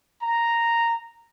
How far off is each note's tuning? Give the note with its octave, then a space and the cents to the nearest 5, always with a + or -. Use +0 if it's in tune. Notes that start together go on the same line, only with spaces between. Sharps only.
A#5 -5